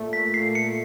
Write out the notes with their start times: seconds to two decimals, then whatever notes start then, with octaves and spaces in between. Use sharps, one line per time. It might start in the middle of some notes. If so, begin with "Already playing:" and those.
Already playing: A#2 A3
0.13 B6
0.34 A#2 C7
0.55 C#7